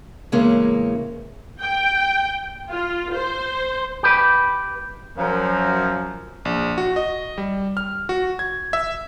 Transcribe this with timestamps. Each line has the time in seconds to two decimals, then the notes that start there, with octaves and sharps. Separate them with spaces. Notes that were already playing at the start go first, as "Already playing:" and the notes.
0.32 E2 A2 C#3 G#3 A#3 C#4
1.60 G5
2.71 F4
3.13 C5
4.03 G4 B4
5.17 F#2 F3 A#4
6.45 A#1
6.78 F#4
6.96 D#5
7.38 G3
7.77 F6
8.09 F#4
8.39 G#6
8.73 E5